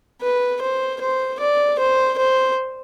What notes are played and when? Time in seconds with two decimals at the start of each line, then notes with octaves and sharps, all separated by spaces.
0.22 B4
0.61 C5
1.01 C5
1.40 D5
1.79 C5
2.18 C5